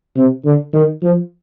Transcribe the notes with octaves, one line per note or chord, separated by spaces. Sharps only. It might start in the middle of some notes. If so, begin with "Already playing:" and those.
C3
D3
D#3
F3